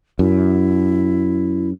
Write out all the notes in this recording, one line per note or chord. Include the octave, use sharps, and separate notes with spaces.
F#2 E4